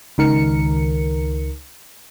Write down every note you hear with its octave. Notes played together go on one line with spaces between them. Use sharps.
C#2 D#3 A#4 C#7